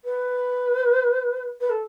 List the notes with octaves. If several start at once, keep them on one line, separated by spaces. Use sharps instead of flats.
B4
B4
A4